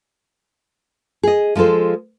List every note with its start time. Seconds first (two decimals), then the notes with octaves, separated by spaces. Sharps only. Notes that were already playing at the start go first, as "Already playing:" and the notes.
1.23 G#4 D#5
1.55 F3 G#3 F4 A4 C5